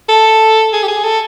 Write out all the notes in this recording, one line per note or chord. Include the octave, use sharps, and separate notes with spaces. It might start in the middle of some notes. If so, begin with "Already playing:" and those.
A4
G#4
G4
G#4
A4